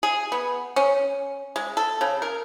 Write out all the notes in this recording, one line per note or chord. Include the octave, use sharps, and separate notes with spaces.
G#4
B3
C#4
G#3
A4
C#3
A#4